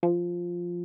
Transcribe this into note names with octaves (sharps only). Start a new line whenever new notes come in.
F3